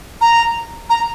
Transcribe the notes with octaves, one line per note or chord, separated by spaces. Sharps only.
A#5
A#5